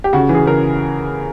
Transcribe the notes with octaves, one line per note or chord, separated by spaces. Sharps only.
G4
C#3 F#4
E3
G#4
C#3 A#4